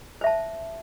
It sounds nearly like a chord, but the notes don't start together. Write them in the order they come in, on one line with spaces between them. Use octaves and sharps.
C5 E5 A5